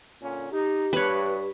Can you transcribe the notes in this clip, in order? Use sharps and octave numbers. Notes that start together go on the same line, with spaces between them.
A#2 D3 C#4
D#4 G4
G2 B4 C#5